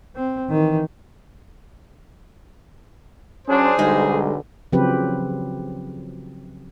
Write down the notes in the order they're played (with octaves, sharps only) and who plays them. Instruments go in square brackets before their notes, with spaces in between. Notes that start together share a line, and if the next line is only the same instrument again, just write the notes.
[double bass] C4
D#3 E3
[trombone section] F#3 D4 [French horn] C#4 [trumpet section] G#4 C5
[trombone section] B1 [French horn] D3 [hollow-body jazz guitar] G3 G#3 D#4
[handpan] C#3 F3 F#3 C4 G4 B4